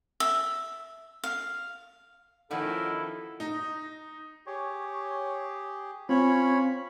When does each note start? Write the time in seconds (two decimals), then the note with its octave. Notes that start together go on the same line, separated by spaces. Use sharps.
0.20 E5
1.24 F5
2.51 D#3 F3 C#4 E4 F#4 A4
3.40 D#4
4.47 G4 G#4 C#5
6.09 C4 C#4 F4 C#5 B5